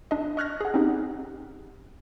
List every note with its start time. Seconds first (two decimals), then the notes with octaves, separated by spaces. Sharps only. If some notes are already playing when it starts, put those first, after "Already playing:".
0.11 D4 D#5
0.37 D#5 C#6 F6 F#6 G#6 A#6
0.61 G#4 F#5
0.74 C4 C#4 D#4 G4